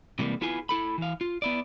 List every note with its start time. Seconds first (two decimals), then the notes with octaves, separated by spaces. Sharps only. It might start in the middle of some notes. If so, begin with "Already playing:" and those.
0.19 C3 E3 G3 G#3 A#3
0.41 B3 E4 F4 G#4 G#5
0.69 E4 A4 B5
0.98 E3 F5
1.21 F4
1.42 B3 E4 D5